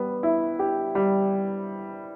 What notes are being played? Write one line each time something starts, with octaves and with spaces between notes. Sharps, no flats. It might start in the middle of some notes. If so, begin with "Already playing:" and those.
Already playing: G3 B3
E4
G4
G3